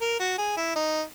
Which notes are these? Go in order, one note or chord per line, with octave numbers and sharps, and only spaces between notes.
A#4
F#4
G#4
E4
D#4